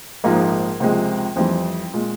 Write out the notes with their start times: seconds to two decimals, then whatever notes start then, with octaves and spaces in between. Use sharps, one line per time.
0.24 A#1 G#2 F3 G#3 A#3
0.80 C#2 C3 F3 G#3
1.36 F2 E3 G3 C4
1.93 A#2 G#3